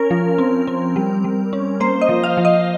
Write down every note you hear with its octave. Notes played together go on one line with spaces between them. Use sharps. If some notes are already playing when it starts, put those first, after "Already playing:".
Already playing: C#4 A#4
F3
C4
C4
G3
G3
C#4
A#3 C5
D#5
F3
F5
F3
D#5